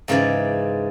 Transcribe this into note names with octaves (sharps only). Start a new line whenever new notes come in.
G#2 C#3 E3 D5